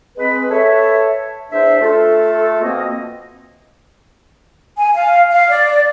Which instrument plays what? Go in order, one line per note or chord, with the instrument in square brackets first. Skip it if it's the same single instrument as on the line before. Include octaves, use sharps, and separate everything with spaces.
[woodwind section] G#3 C4 B4
A4 B4 C#5 E5
E2 D4 C5 E5
A3 F4 A4
B2 F3 A#3 C4 D#5
[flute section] G#5
F5
F5
D5